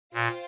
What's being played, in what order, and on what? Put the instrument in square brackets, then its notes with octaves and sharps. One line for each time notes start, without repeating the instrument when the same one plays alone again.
[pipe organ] A#2 [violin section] F4 C5 G5